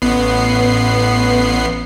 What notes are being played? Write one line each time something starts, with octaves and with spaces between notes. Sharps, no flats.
A1 B3 C7